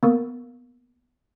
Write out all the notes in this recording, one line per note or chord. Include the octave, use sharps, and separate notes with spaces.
A#3 B3 A#4